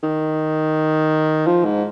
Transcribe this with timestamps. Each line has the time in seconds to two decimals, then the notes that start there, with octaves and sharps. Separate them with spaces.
0.03 D#3
1.47 F3
1.65 G#2